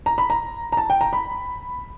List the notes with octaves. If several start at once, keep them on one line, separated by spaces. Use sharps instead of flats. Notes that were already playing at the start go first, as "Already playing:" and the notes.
A#5
B5
A#5
A#5
A5
G5
A#5
B5